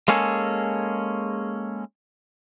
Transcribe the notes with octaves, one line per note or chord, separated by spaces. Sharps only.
G#3 A#3 C#4 G#4 A4